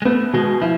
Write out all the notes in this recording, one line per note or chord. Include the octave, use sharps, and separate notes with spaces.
G#3
A3 B3
B2 G#3
F3 E4